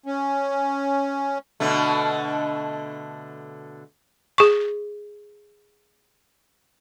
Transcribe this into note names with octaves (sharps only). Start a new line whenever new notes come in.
C#4
B2 D3 A3
G#4 C#6